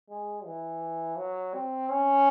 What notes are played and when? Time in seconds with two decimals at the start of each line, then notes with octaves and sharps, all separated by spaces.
0.09 G#3
0.45 E3
1.18 F#3
1.54 C4
1.89 C#4